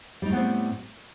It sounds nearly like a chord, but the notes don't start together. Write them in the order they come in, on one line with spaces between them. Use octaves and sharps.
G3 D#4 A2 B3 C4